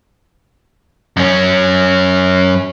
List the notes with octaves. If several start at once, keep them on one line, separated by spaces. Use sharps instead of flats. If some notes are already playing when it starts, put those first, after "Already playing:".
F#2 C#4